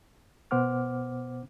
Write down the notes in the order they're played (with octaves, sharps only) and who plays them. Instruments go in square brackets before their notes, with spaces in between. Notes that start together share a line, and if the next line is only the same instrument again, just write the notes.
[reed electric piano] B2 B3 C5 F#5 D6 F6